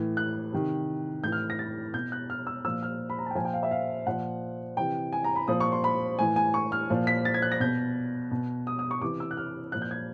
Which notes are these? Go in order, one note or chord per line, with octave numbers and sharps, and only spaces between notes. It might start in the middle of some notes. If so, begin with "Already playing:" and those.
Already playing: A2 E3
F#6
C3 D#3
A2 E3 G6
F6
A#6
A6
B2 G6
F#6
F6
E6
A#2 F3 E6
F6
B5
A#5
A5
G5
A#2 F3 G#5
G5
F5
E5
F5
A#2 F3 F#5
C3 E3 G5
G#5
A#5
B5
A#2 F3 D#6
C#6
C6
B5
A2 E3 G#5
G#5
C#6
F6
A#2 F3
B6
A6
G#6
F#6
A#6
B2 G6
B2
D#6
D#6
C#6
C3 E3 D6
E6
F#6
F6
A#2 F3 F#6
G6
G#6